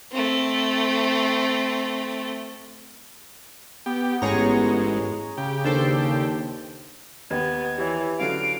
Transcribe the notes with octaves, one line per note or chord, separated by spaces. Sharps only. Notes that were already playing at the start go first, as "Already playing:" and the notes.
A3 C4
B3 G4
A1 G#2 G#4 C#5 A#5
C#3 G4
D#2 D4 A4 C5
D#2 B3 G4 B4 D#5 G#6
E3 G4 C#5
D3 F#3 C#4 F5 D7